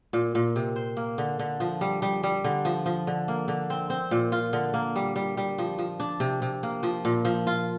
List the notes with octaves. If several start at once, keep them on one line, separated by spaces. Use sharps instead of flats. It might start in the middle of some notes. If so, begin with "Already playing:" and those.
A#2
A#2
C3
C5
A#3
D3
D3
F3
G3
G3
G3
D3
F3
F3
D3
A#3
D3
C4
C4
A#2
F4
D3
A#3
G3
G3
G3
F3
F3
D4
C3
C3
A#3
F3
A#2
F3
F4